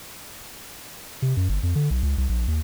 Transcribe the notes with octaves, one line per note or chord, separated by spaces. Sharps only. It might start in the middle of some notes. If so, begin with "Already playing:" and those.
C3
F#2
G1
F2
D3
B1
C#2
C2
A#1
D#2